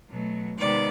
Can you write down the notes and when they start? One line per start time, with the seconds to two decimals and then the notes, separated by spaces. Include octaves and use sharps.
0.09 B2 F#3 A3
0.58 C3 D#3 G#3 B3 D5